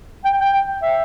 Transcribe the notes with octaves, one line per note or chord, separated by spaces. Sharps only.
G5
G5
E5